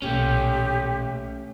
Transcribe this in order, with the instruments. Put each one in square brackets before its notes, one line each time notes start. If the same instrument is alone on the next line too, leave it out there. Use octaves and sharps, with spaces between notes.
[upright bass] B1 A#2 [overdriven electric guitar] A3 C#4 [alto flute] G4